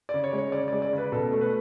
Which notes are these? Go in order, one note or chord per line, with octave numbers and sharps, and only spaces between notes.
C#3 D5
C#5
G#3
C#5
C#3 D5
G#3 D5
D5
C#3 B4
B2 A4
A3
B4